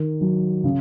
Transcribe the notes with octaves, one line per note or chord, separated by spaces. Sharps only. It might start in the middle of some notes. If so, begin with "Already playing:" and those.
Already playing: D#3
F#3
C#3